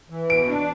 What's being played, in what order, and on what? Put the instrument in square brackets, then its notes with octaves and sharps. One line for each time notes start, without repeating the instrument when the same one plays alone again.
[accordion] E3
[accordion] B2 [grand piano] D7
[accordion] D4